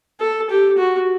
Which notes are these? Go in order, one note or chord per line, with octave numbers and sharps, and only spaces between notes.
A4
G4
F#4